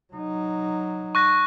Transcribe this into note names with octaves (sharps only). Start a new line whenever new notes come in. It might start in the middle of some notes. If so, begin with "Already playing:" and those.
F#3 D#4
C#6 F#6 A#6